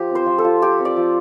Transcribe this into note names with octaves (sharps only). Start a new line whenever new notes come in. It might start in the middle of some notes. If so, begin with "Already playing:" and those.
Already playing: F3 G4
C4
C5
F3
A4
F4
F3 G4
C4
D5
F3